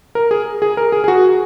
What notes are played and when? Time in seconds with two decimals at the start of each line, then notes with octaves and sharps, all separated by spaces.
0.15 A#4
0.31 G#4
0.62 G#4
0.77 A#4
0.92 G#4
1.04 G#4
1.08 F#4